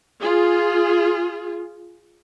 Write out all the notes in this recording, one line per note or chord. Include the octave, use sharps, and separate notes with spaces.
F4 G#4